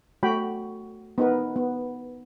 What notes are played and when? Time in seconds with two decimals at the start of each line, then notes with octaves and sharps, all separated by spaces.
0.23 A3 F#4 G5 B5
1.18 B3 D#4 A#4 B4
1.56 B3